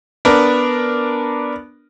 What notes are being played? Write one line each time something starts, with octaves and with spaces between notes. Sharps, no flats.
B3 D4 A#4